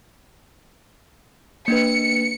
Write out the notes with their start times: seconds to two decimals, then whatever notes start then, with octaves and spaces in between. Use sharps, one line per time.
1.68 A#3 D4 B4 C#7